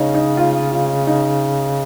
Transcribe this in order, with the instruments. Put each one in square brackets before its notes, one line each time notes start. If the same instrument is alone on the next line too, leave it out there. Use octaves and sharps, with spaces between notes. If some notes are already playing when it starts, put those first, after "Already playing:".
Already playing: [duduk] C#3 [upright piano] C#4 D#4
[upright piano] D#4
F4
F4
D#4